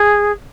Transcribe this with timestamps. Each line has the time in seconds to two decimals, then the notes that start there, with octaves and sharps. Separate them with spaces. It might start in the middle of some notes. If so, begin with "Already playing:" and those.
Already playing: G#4